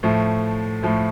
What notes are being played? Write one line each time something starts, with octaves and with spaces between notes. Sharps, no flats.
A2 F3 A3
A2 F3 A3